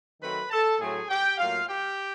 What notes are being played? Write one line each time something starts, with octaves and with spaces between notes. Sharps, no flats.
D#3 F#3 A3 C4 B4 B5
A4 A5
A2 F#3 A3 C4 G#4 G#5
G4 G5
A2 F#3 A#3 F4 F5
G4 G5